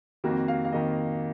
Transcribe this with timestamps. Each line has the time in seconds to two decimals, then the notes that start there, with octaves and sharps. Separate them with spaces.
0.24 F2 D#3 A#3 F#4
0.48 F5
0.65 F5
0.72 F2 D#3 A#3 D#5